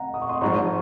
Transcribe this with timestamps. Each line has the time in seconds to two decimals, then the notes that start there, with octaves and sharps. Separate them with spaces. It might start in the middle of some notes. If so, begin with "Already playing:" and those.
Already playing: F#5 A#5
0.14 D#6
0.22 C#6
0.29 C6 D#6
0.41 G#1 G#2 F3 A#5 C#6